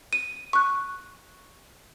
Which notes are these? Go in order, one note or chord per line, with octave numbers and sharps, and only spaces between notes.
D#7
C#6 F#6